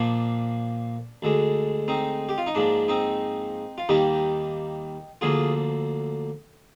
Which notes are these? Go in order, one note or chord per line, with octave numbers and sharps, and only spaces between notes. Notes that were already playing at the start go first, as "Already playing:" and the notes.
Already playing: A#2 F3 A#3 D4
D2 D3 G#3
C4 D#4
G4
F4
D#4
G#2 F3 A#3 D4
C4 D#4
F4
D#2 D#3 G3 A#3 D#4 G4
D2 D3 F3 A#3 F4 G#4